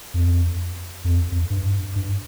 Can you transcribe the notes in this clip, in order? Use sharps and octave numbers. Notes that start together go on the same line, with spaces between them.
F2
F2
F2
G2
G2